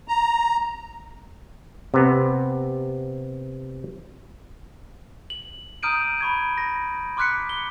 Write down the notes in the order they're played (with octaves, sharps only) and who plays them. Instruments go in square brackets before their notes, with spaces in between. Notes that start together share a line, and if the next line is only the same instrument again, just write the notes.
[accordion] A#5
[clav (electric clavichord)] C3 B3
[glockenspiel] F#7
A#5 D#6 F6 G6 D7 D#7
B5 C#6 G#6
A#6
C6 D6 F6 F#6 B6 C#7
G7